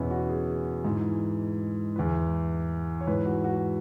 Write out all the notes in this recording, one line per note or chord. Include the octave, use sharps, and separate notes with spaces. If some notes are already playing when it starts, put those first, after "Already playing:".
Already playing: E2 B2 B3 C#4 E4
F#4
G#4
G#2 E3
E2 E3 B4
C#5
G#2 E3 B4
F#4
F#4